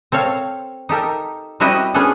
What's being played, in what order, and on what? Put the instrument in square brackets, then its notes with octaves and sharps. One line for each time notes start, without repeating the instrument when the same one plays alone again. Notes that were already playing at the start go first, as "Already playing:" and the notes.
[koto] C4 A4 C#5 F5
D#4 G4 A4 A#4
G3 C4 E4 F#4 G4 D#5
B3 C#4 D4 G#4 A4